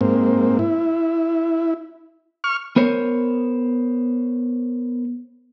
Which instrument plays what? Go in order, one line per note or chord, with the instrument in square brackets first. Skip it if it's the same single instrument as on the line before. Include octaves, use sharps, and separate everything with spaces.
[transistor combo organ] G#2 A#3 C4
E4
C#6 F6
[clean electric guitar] B3 A#4 C5 C#5